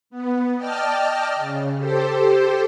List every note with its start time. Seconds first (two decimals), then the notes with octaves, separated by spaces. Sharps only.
0.10 B3
0.56 D5 D#5 G5 A5 F6
1.36 C#3
1.76 G4 A4 C5